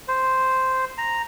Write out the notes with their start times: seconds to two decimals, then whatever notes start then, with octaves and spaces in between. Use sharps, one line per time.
0.08 C5
0.98 A#5